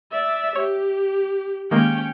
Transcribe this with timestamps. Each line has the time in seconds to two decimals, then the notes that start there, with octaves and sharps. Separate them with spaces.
0.11 D5 E5
0.55 G4 C#5
1.71 D#3 G#3 A#3 C#4 G5